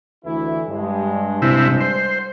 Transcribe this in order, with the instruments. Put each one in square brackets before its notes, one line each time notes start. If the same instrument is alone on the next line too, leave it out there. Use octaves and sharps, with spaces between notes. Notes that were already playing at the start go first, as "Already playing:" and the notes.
[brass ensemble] D2 E3 E4
G2 G#3
[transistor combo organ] C3 E4
C5